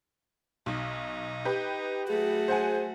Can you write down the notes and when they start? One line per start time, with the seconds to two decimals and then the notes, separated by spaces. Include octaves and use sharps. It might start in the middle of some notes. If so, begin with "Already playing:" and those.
0.66 B1 D#4
1.45 G4 B4
2.08 F#3 A3 F#4 G#4
2.48 C5 F#5 G#5